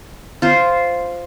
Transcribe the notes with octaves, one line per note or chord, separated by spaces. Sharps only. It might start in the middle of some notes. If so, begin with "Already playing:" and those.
F4 C5